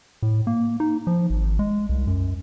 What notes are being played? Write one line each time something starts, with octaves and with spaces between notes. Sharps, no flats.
A2
A#3
D#4
F3
G#1
G#3
C2
F#2